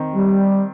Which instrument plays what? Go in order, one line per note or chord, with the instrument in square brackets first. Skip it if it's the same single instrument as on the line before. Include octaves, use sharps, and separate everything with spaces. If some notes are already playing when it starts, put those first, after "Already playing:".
Already playing: [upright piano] D#3 C4
[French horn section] G3